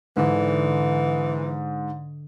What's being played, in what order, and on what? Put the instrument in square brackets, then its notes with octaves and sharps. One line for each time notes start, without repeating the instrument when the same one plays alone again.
[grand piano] G#2 [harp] D3 [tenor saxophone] E3